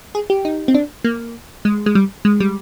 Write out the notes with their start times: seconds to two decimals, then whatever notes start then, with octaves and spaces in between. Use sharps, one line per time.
0.15 G#4
0.30 G4
0.45 D#4
0.68 C4
0.74 D4
1.04 A#3
1.65 G#3
1.86 G#3
1.95 G3
2.25 G#3
2.40 G3